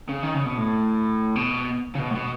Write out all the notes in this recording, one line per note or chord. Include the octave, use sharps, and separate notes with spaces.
C#3
D#3
C#3
B2
A2
B2
C#3
B2
A2
B2